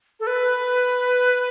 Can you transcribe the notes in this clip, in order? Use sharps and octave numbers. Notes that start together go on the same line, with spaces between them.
A4
B4